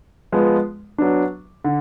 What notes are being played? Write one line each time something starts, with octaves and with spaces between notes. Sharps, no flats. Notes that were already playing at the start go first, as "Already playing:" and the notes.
F3 G#3 B3
F#3 B3 D4
D3